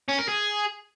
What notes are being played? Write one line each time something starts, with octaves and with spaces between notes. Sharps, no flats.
C#4
A#4
G#4